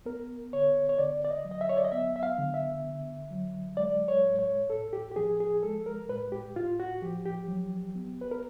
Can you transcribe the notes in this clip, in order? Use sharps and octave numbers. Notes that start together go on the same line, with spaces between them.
B3 A#4
D3 C#5
C#5
D3 D5
D5
D#5
F#3
D#5
E5
C#5
D5
D#5
B3 E5
E5
F5
D3
E5
D3
F#3
G#3 D5
C#5
A2
C#5
A2 A4
G4
G4
F3 G#4
G#4
G#3 A4
A#4
A2 B4
G4
A2 F4
F#4
F3 G4
G4
F#3
B3
B4
A#4